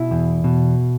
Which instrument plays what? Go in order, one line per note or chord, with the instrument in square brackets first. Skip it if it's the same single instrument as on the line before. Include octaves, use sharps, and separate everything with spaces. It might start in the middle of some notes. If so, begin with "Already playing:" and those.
Already playing: [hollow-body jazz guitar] B2 E4
E2
B2